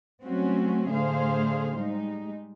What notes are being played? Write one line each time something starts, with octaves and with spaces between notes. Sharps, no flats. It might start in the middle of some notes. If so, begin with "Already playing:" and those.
F#3 G3 A3 C4 C#4 F#4
A2 D3 A3 G#4 C5 F5
G3 G#3 D#4